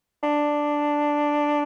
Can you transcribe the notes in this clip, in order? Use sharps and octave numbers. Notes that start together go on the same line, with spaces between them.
D4